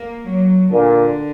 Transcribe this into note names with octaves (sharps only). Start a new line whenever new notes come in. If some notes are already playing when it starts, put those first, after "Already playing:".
Already playing: A#3
F#3
A#2 D3